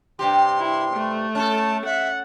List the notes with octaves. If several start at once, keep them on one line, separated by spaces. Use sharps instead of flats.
G2 C3 G4 C6
E4
A3
C#4 A4 A5
E5 F#5